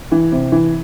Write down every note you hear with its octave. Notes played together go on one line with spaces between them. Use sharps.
E3
C3
E3